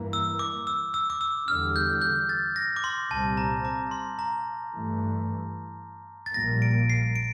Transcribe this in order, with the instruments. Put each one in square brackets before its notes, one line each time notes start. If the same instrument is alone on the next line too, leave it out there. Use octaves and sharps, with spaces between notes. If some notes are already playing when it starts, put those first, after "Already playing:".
Already playing: [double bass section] G2 E3 A#3
[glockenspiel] E6
D6
E6
E6
D6
E6
[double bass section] E2 D3 G3 [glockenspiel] F6
[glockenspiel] G6
G6
A6
A#6
D6
C6
[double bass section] C2 A#2 G3 C4 [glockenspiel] A5
[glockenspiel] A#5
A#5
C6
A#5
[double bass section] G2 E3 A3
[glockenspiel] A6
[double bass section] A#1 A#2 G3 A#3 [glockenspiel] A#6
[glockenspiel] D7
C7
D7